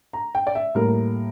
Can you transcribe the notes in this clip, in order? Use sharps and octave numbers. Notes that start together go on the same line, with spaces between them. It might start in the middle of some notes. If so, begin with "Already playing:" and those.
A#5
G5
D5
E5
A2 G3 A#3 A#4